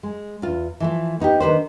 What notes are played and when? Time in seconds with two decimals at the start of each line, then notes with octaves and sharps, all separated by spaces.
0.03 G#3
0.42 E2 F4
0.80 E3 F3 A3
1.20 B3 D#4 F4 G4
1.40 D#3 D4 B4 C5